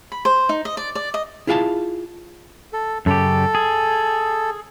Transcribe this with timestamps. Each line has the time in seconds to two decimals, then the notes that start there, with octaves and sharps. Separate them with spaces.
0.12 B5
0.25 C5
0.49 D#4
0.65 D#5
0.77 D5
0.95 D5
1.14 D#5
1.47 E4 F4 G#4 F5 G#5 A5
2.73 A4
3.06 F#2 C#3 G4 A4
3.55 G#4